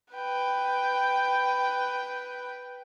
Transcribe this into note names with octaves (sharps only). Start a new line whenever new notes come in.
B4 G5